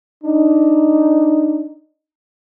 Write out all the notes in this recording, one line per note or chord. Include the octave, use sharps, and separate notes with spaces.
D4 D#4